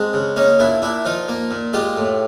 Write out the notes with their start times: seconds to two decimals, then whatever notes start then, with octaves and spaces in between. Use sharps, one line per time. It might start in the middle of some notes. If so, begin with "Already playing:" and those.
Already playing: G#3 C4 D4
0.13 C#3
0.36 A#3 C#4 D#4
0.59 A#2 D4 E4
0.82 A#2 D4 E4
1.05 F3 D#4 F4
1.28 A#3
1.51 A#2
1.73 G#3 F4 G4
1.97 A2